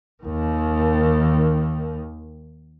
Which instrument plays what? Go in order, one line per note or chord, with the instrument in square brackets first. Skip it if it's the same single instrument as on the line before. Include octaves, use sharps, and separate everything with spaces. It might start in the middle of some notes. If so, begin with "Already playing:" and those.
[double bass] D#2 D#3